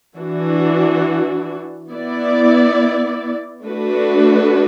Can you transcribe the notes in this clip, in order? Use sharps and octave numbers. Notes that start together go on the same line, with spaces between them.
E3 D4 F#4
B3 E4 D5
A3 D4 F#4 B4